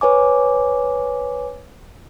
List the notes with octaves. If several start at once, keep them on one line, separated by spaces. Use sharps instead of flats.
B4 C#5 G#5 D6